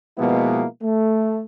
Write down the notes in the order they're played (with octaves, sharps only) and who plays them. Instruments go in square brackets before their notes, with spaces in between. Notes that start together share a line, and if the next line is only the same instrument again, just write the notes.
[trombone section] B2 F3 G#3 A#3 B3 E4
A3